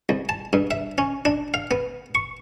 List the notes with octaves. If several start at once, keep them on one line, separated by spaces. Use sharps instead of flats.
C2
A5
G2
E5
C#4
D4
F5
B3
C#6